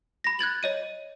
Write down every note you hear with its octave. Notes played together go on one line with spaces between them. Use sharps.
B5 A#6
F#6 G#6 A6 F#7
C#5 D#5 D#7